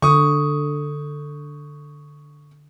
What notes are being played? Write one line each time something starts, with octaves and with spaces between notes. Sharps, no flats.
D3 C#6 D#6